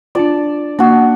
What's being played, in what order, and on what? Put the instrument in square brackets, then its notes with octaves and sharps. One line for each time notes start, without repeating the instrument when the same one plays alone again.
[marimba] D4 F4 [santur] D5 A5
[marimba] A#3 [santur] D4 F#4